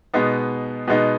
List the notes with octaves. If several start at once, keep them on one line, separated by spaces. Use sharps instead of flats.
B2 G#3 B3 D#4
B2 G#3 B3 D#4